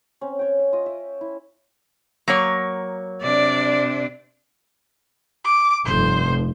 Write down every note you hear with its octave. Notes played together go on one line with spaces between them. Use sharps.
C4 C#4
C#5 G5
E5
F4 D#5
E5
E4
F#3 A#3 C#5
C3 D4 D5
D6
F1 G2 C5